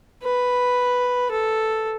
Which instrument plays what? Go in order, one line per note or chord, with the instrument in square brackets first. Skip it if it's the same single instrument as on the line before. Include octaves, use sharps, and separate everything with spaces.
[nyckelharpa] B4
A4